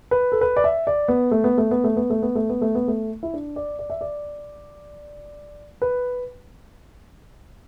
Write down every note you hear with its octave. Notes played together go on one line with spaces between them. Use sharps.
B4
A4
B4
D5
E5
D5
B3
A3
B3
A3
B3
A3
B3
A3
B3
A3
B3
A3
B3
A3
E4
D4
D5
D5
E5
D5
B4